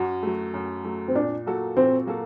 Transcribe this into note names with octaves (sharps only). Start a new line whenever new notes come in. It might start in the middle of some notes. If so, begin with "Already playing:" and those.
Already playing: F#2 F#4
F#3 A3
F#2
F#3 A3
C4
A#2 D4
F#3 A#3 F#4 A4
A#2 C4
F#3 A#3 F#4 A4